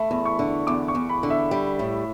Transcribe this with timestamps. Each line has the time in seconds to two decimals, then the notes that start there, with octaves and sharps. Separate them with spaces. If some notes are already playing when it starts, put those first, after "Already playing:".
Already playing: A3 B5
0.11 E2
0.25 C#6
0.39 D3
0.67 E2 D6
0.88 C#6
0.95 E2
1.09 B5
1.23 D3
1.30 E5
1.51 G3
1.79 A2